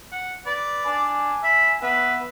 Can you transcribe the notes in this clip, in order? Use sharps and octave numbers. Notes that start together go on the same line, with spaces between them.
F#5
B4 D5
D4 G#5
E5 B5
B3 B4 E5